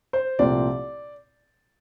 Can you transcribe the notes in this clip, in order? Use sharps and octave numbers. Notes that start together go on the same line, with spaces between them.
C5
C2 A#2 F3 A3 C4 D5